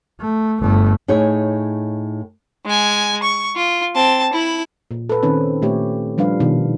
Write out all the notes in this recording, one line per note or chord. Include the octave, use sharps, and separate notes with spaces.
A3
G1 A3
A2 D#4 G#4 C#5
G#3 G#5
C#6
F4
C4 A5
E4 B5
A#2
A4 B4
D#3 C4 C#4 B4
A#2 A3 G4 C#5
F3 G3 D4 B4 F5
B2 D#3